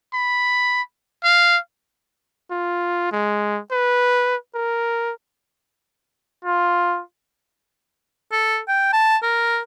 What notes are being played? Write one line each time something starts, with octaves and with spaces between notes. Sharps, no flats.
B5
F5
F4
G#3
B4
A#4
F4
A4
G5
A5
A#4